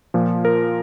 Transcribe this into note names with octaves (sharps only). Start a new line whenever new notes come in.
A#2 F3
A#4